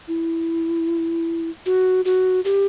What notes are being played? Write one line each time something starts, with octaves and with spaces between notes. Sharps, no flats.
E4
F#4
F#4
G4